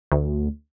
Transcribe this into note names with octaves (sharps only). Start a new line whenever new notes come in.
D2